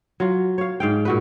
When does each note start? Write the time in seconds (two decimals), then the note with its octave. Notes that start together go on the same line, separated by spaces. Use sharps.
0.20 F#3 F4
0.58 C#5 F5
0.80 G#2 F5 G5
1.05 A#2 F#4 B4